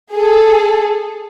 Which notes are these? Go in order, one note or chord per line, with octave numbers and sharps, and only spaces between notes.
G#4 A4